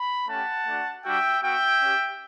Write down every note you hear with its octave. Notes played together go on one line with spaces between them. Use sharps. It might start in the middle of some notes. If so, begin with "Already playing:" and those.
Already playing: B5
A3 C#4 G4 F#5 A5
A3 D4 F#4
G3 D4 F#4 E5 G5
B3 F#4 E5 G5
C#4 G4